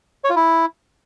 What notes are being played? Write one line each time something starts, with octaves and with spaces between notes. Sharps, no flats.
C#5
F4
E4